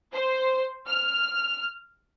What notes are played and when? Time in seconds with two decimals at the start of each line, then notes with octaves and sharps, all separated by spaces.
0.13 C5
0.87 F6